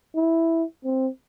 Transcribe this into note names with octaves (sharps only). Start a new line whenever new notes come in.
E4
C4